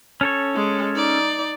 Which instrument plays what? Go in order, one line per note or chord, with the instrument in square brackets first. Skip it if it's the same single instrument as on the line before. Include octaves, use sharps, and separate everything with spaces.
[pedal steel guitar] C#4 A4 C#5
[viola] G#3
D#4 D5